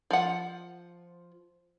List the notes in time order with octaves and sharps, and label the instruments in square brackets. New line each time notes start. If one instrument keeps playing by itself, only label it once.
[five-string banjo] F3 F#5